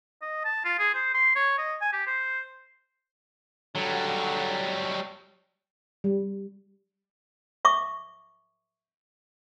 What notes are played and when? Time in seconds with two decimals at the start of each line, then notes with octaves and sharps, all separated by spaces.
0.22 D#5
0.45 A5
0.65 F4
0.79 G#4
0.94 C5
1.14 C6
1.36 C#5
1.58 D#5
1.81 G#5
1.93 G4
2.07 C5
3.75 D3 F#3 G3
6.04 G3
7.65 E5 C#6 D6